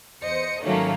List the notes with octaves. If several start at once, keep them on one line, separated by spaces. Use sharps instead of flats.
E2 C5 D#5 C#7
G#2 D#3 F#3 A3 A#3 C#4